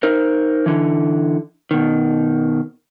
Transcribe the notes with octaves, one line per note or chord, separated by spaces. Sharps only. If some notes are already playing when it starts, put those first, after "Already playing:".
D#4 A#4 C5
D3 E3
B2 D#3